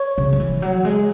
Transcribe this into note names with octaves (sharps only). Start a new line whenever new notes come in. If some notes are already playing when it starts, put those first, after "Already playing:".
Already playing: C#5 C#6
C#3
F#3
E3
F#3
G#3